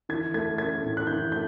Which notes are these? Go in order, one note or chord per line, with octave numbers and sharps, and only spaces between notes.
E3 G#6
A3 G#6
C#4 G#6
A2
F#6
E3 G6
A3 G6